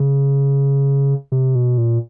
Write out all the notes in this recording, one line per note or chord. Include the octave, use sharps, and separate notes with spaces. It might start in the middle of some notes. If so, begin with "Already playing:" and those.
Already playing: C#3
C3
B2
A#2